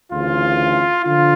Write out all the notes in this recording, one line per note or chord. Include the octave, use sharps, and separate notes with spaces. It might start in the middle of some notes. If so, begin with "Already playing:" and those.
D2 C#3 E3 F4
D3 F3 F4